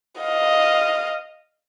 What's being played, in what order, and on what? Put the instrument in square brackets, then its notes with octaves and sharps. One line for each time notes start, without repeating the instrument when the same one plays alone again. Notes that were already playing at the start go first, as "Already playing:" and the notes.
[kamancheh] D#5 F5